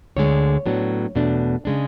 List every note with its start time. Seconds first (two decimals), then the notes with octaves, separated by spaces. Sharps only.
0.17 D2 D3 G#3 C#5
0.66 A2 F#3 B3 D4
1.15 E2 B2 A3 D4
1.65 C#3 G#3 D4